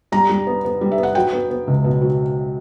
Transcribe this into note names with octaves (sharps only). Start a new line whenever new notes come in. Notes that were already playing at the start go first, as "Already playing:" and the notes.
G3 A#5
G3
B3
B3
G3
E5
B3
F#5
F#3 G5
B3
B3
C#2
B2
F#3